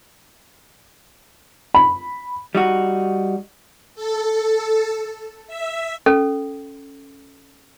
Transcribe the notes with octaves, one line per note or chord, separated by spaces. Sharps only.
B5
G3 D#4 F#4
A4
E5
C#4 A4